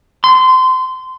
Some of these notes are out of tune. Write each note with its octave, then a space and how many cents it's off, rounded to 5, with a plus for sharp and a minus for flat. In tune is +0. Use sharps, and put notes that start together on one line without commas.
C6 -25